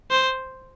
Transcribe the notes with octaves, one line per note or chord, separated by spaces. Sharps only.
C5